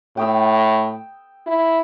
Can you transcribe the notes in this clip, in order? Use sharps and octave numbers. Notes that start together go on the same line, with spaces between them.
A2 G5 D#6 E6
E4